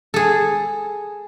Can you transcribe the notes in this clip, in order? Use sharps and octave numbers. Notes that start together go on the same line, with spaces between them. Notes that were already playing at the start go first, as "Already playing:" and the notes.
G#4 A4